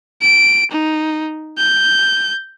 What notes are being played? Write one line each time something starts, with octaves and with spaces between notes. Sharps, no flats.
D7
D#4
G6